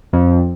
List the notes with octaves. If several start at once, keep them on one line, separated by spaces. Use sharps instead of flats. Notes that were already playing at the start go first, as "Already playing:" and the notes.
F2